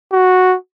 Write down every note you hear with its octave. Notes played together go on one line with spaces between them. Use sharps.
F#4